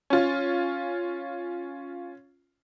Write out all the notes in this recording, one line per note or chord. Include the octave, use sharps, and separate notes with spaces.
C#4 F4